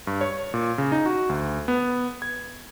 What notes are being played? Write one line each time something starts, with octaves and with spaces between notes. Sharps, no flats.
G2
C#5
A#2
C#3
D#4
F#4
D2
B3
G#6